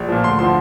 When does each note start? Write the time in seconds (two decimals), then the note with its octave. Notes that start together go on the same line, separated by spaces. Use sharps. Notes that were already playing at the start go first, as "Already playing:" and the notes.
Already playing: A#1
0.09 A#2 F3
0.24 D2 C6
0.39 D3 F3 C6